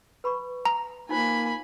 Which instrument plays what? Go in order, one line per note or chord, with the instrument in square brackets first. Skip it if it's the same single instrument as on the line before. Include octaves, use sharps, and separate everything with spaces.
[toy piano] B4 B5 C#6
[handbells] A#5
[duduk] A#3 [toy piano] D#4 F4 C5 [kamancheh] G#5 B5